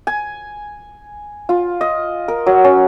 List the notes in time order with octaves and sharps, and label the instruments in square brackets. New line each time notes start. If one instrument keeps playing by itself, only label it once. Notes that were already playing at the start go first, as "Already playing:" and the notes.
[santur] G#5
F4
D#5
A#4
F#3
C#4